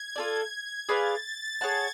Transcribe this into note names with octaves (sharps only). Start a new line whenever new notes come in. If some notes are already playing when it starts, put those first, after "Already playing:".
Already playing: G#6
F4 A4 D5
G#4 B4 D5 F5 A6
G#4 C#5 F#5 A5 G#6